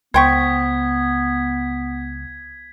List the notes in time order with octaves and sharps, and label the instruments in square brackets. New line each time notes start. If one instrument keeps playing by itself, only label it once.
[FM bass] C#2 [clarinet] B3 [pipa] C5 G5 C#6 [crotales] G#6 B6